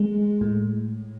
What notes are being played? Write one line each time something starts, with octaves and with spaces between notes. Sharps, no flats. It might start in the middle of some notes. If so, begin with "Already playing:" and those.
Already playing: G#3
A2